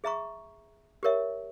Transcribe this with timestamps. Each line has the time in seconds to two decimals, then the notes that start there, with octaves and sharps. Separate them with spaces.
0.04 G#4 E5 A#5 C#6
1.03 G4 A#4 C#5 E5